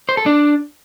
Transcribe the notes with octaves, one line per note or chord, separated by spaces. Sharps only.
C5
A4
D4